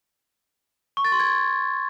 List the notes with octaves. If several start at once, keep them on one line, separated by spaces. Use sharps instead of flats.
C#6
A6
C6
G#6